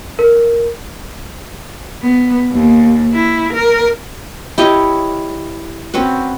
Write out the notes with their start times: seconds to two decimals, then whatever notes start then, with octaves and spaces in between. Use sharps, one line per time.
0.19 A#4
2.02 B3
2.53 D#2
3.14 E4
3.54 A#4
4.58 E4 G4 C#5 D#5
5.94 C4 C#4 F#4 B4